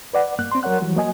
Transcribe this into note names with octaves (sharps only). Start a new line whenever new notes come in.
B4 D5 F#5
G2 A#3 F#6
C4 C6
F#3 A#4 C#5 F#5 F#6
E3 F#3 G3
F#3 A#3 D#5 G#5